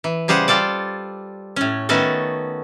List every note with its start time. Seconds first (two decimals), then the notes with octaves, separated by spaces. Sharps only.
0.04 E3
0.28 C#3 G3 G#4 C5 F#5
0.48 G3 F4 A4 D5
1.56 A2 C#4
1.89 D#3 A3 B3 C#4 F#4 A4